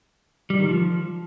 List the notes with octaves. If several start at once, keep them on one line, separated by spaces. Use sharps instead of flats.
G3
D#3
F3